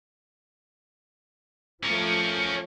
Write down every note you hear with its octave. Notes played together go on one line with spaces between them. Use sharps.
F3 A3 C#4 A#4